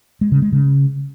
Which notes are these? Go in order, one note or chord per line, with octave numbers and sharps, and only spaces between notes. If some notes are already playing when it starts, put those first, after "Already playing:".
G#3
C#3
G#3
C#3